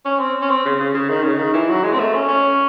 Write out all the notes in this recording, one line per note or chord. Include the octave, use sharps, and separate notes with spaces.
C#4
C4
C#4
C4
C#3
C#3
C#3
D#3
C#3
D#3
E3
F#3
G#3
C4
A3
C#4
C#4